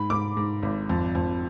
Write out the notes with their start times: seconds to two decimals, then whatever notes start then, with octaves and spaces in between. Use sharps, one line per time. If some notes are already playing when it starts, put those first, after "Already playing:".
Already playing: G#2 B5
0.10 G#2 D6
0.37 G#2
0.63 G#1
0.89 F2
1.15 F2